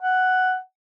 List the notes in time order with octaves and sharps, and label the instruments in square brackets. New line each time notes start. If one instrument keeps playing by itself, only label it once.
[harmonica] F#5